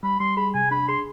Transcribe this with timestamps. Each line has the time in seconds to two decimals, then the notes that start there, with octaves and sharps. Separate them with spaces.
0.03 G3 B5
0.20 G3 C6
0.37 G#4 B5
0.54 C3 G#5
0.71 D4 B5
0.88 G#4 C6